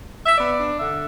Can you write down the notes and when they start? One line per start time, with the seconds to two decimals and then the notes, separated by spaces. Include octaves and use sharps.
0.25 E5
0.37 B3 D5
0.58 D4
0.79 D3 E5